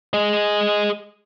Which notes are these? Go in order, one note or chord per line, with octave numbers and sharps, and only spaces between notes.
G#4 D#5